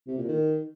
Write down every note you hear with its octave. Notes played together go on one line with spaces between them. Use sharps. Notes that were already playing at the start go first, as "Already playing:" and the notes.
C3
A#2
D#3